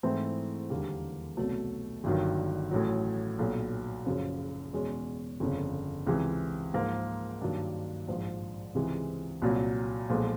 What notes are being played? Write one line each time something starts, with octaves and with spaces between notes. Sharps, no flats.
G#2 E3 A3 C4 E4
E1 D#2 D3 G3 A#3
C2 B2 F#3 A3
G1 G2 D#3 F#3
A1 A2 F#3
B1 A#2 F#3
F#1 F#2 C#3 F3
E2 B2 G#3 C#4
G1 F2 C#3
C#2 C3 E3
G#2 F3 A#3
G2 D#3 F#3 A#3 D4
A#1 G#2 F3
C#2 C3 E3 G#3
C2 A#2 F#3
B1 A#2 F3 G#3